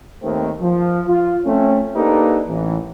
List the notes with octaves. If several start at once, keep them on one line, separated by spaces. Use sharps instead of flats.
D#2 D#3 A3 C4
F3
F4
A3 C4 C#4
A#3 D4 D#4 G4 A4 B4
A1 E3